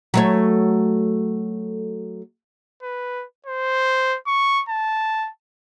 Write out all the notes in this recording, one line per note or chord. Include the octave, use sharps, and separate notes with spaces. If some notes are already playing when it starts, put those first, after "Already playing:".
F#3 A3 C#5
B4
C5
C#6
A5